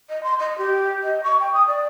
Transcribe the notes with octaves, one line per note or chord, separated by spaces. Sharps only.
D#5
C6
D#5
G4
D#5
C#6
G5
D#6
D5